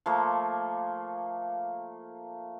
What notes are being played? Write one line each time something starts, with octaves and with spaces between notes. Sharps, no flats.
F3 A3 A#3